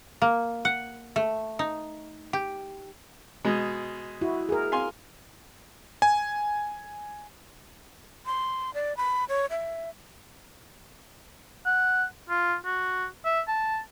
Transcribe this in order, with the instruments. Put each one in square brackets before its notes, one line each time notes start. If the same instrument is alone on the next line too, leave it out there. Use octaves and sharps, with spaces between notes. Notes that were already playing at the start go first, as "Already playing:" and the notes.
[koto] A#3
F#5
A3
D#4
G4
[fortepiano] B2 G#3
[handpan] E4 F#4
G#4 A#4
[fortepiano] F5 G#5 C6
[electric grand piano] G#5
[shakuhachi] C6
D5
B5
C#5
E5
[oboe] F#5
F4
F#4
E5
A5